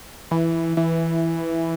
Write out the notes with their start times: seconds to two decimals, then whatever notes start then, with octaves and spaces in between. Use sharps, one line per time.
0.31 E3
0.77 E3